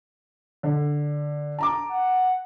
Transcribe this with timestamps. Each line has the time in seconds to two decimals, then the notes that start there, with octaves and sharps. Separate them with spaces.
0.63 D3
1.58 A5 A#5 D6
1.91 F#5